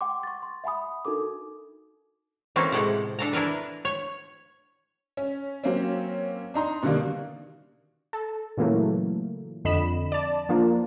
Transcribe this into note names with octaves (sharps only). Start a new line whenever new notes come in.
F#5 G5 C6 D6
C#6 A6
C6
E5 F#5 G#5 B5 D#6
D4 D#4 F#4 A4 A#4 D6
E3 A#3 C4 C#4 F#4 A4
A2 C3 G#3 G4 A4 F#5
D4 A4 A#5
D4 E4 A#4 B4
C#5
C#4
F#3 A#3 C4 C#4
D4 D#4 A#5 C6
B2 D3 D#3 G3 A#3
A4
A#2 C#3 E3 F#3 A3 A#3
F2 D3 D#5 B5 E7
D5 A5
F3 A#3 D4 F4